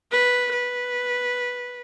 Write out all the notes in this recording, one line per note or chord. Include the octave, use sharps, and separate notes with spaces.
B4
B4